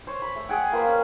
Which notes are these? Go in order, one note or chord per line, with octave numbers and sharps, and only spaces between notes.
C5 C#5
B5
A3
G#4 F#5 G5
A#3 F4 B4 C5
C#4